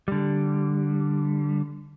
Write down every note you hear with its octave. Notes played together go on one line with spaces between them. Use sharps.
D3 G3